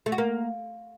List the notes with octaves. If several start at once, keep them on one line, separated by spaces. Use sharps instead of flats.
A3
F#4
A#3